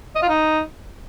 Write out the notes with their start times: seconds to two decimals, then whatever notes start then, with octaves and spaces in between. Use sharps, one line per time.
0.15 D#5
0.22 F4
0.29 D#4